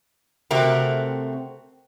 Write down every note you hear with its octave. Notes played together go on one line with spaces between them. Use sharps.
C3 A3 C4 F#4 A#4